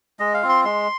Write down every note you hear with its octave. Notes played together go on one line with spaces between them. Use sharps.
G#3 D#5
F5
C4 F4
C6
G#3 C6